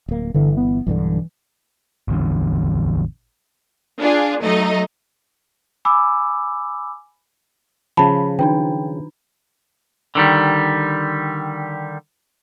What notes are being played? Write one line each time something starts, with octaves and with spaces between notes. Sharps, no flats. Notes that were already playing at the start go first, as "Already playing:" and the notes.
D1 A#3
G1 D3 E3
B3
B1 G2 D3 E3
A1 E2 D3
D4 F4 G#4
F#3 A3 D#4 D#5
G#5 B5 D6 E6
C#3 F3 A5 B5
D#3 D4 D#4 G5
D3 D#3 G3